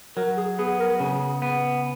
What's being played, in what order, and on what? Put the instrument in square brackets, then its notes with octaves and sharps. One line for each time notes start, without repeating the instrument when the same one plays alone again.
[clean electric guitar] F#3 [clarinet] A#4
[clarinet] G#4
[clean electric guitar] B3 [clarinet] G#4
[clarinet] A#4
[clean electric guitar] C#3 [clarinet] G#4
[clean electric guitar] B3